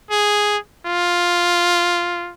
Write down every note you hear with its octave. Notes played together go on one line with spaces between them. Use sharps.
G#4
F4